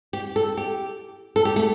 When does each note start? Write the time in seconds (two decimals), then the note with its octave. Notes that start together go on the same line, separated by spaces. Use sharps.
0.13 G4
0.36 A4
0.57 G4
1.36 A4
1.45 G4
1.56 A3